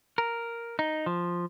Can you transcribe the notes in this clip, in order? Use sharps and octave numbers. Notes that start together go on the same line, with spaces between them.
A#4
D#4
F3